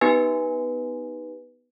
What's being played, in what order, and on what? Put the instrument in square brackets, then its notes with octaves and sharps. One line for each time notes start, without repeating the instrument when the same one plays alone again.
[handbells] B3 D#4 G4 B4 G#5